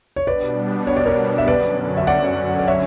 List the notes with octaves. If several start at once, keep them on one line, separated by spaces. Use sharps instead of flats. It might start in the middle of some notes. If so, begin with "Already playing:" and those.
C#5
B2 G3 B3 D4 B4 D5
C#5
D5
A#4 C#5
E5
F#2 D3 F#3 C#4 B4 D5
E5
D5 F#5
D5
C#5 E5